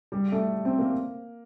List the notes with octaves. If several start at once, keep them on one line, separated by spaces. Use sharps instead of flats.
G3
A3
C4
A#3